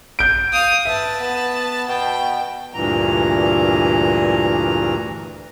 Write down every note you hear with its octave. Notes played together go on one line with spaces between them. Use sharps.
G6 D7
F5 D#6
B4 E5 A5
B3
B2 G5
D2 G2 A#2 E3 A#5